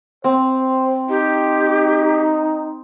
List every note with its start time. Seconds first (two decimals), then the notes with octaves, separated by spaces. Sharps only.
0.24 C4 C5
1.10 D#4 G4